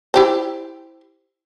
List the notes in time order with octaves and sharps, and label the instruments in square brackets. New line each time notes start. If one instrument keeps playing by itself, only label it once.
[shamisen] E4 G4 C5